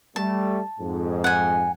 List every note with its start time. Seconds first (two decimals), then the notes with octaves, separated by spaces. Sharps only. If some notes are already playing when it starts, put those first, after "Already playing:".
0.16 G3 A3 A5
0.79 F2 G#2
1.24 F#5 G#5